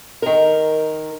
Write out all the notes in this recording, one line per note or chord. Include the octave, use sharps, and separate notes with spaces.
D#3 A#4